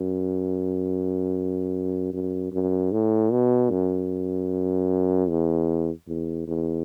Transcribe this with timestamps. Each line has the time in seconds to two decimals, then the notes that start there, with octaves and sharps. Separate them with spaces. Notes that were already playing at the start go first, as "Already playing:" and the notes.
Already playing: F#2
2.13 F#2
2.52 F#2
2.92 A2
3.32 B2
3.71 F#2
5.29 E2
6.08 E2
6.48 E2